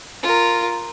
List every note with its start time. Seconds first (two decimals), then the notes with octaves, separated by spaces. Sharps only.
0.23 F4 A#4